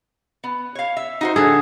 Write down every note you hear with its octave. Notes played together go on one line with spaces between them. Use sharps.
B3
C#5 F5
E5
D#4 F#4 C5
D3 G#4 A4